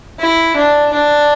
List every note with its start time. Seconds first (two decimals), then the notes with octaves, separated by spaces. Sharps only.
0.19 E4
0.56 D4
0.93 D4